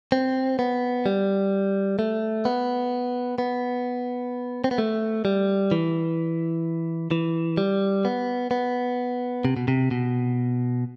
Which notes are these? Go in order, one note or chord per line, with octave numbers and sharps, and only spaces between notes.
C4
B3
G3
A3
B3
B3
C4
B3
A3
G3
E3
E3
G3
B3
B3
C3
B2
C3
B2